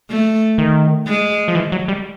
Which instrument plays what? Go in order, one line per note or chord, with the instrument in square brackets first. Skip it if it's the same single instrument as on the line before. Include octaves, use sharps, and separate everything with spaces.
[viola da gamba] A3
[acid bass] D#3
[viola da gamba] G#3
[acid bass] F3
E3
F#3
G3